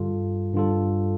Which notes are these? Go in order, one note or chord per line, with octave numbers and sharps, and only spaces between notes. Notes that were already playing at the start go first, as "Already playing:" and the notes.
Already playing: G2 D3 G3 F4 A4
G2 D3 G3 F4 A4